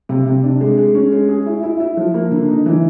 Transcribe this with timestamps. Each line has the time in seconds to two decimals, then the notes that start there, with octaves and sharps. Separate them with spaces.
0.09 C3
0.26 C3
0.43 D4
0.61 G#3
0.78 G#3
0.95 C#4
1.12 G#3
1.29 G#4
1.46 E4
1.63 E4
1.80 E4
1.97 F3
2.14 A#3
2.32 D3
2.48 D#4
2.66 E3